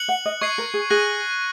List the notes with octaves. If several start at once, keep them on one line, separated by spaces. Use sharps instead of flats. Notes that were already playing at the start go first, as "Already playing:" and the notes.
Already playing: F#6 C#7 F#7
F#5
D#5
D#5 C#6 G#6 C7 D#7 F#7
A#4
G#4
G#4 F#6 A#6 D#7 F#7